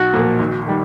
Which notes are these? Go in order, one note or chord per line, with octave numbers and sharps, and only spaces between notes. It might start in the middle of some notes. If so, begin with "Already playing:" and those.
Already playing: B1 F#4
A#2 F3 A#3
G#1
D#3 G3